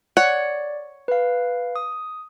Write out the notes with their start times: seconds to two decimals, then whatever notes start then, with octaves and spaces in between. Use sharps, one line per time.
0.17 C#5 D5 F#5
1.08 B4 F5
1.76 D#6